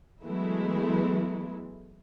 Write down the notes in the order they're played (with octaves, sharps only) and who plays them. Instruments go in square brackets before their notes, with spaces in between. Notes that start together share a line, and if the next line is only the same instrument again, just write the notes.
[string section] E3 F#3 G#3 A3 B3 E4